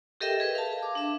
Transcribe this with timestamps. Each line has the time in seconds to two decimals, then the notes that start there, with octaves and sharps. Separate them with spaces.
0.21 G4 A4 A#4 D#5 E5 G5
0.40 G#4 B4
0.55 F5 A5
0.83 D6
0.95 D4 E5